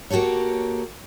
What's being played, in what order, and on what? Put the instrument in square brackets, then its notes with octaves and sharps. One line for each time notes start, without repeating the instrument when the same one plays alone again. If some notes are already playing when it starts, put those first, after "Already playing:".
[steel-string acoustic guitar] A#3 F#4 G4 A4 C#5